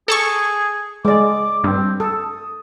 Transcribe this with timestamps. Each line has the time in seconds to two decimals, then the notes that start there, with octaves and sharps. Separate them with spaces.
0.08 G#4 A4 A5 C#6
1.05 G#3 D5 D6
1.64 G2 C4
2.00 A4 D#6